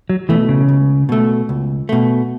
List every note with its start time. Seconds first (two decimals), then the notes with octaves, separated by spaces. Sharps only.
0.10 F#3
0.29 B2 E3 A3
0.49 C#3
0.69 C#2
1.09 B2 A3
1.49 C#2
1.89 B2 A3